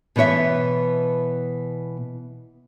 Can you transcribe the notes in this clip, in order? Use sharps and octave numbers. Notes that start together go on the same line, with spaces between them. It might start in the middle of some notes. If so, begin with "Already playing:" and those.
B2 E3 B3 C#5 E5